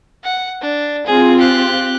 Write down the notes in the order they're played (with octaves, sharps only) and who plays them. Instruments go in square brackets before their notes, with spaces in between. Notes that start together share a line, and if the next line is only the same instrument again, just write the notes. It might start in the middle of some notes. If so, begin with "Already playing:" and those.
[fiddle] F#5
D4
[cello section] C4 F4 [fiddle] G#4
[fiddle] G4 F#6